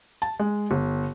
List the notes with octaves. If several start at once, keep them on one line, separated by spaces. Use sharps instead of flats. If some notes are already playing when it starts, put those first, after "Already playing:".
A5
G#3
G1